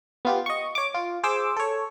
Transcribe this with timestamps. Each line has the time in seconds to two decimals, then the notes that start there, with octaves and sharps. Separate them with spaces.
0.25 B3 F4 G4
0.46 D#5 C#6
0.75 C#5 D6
0.94 F4
1.23 G#4 C5 D6 E6
1.56 A4 C#5